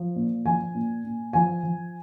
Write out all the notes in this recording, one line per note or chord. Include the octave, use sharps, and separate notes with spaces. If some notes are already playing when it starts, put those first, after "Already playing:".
Already playing: F3
A#2
F3 G#5
A#2
A#2
F3 G#5
F3